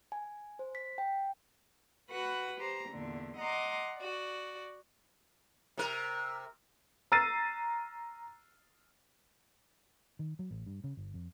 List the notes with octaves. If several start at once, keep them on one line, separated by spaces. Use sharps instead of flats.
G#5
C5
B6
G5
F#4 B4 F#5 B5
G4 C5 A#5
E2 A#2 D3
D#5 F#5 A#5 C6 D6
F#4 D5
C3 A#4
A#5 E6 F6 A6 C7 D#7
D#3
F#3
A1
G2
C#3
G1
F2